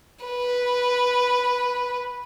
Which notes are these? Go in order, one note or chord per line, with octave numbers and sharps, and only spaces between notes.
B4